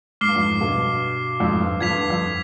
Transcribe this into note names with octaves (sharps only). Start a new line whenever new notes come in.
G#2 D6 F6 C7 G7
G2
F2 G#2
G2 B2
F2 G#2
G2
F2 G#6 B6 F7
G2
G2
F2